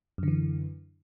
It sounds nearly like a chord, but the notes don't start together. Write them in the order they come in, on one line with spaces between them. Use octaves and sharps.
F#2 D3 E3